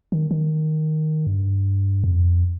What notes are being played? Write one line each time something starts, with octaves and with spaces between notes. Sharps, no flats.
D#3
D#3
G2
F2